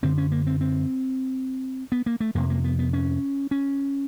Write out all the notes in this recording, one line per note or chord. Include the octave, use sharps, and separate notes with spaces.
F#2 D3 C4
C#4
A#3
C4
C4
B3
A#3
A3
F2 C3 A#3
A#3
B3
B3
C#4
C#4